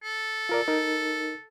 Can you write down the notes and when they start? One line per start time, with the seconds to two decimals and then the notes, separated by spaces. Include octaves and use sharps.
0.03 A4
0.49 F4 A#4 D5
0.68 D#4 A#4